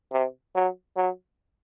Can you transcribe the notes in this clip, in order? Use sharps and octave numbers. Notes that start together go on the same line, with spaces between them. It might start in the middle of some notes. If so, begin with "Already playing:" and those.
C3
F#3
F#3